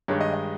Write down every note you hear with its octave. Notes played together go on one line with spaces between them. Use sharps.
G2 D#3 G#3 C#5
D#5
D#5